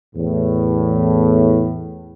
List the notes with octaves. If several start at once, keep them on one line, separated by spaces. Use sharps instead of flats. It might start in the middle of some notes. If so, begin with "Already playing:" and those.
E2 A2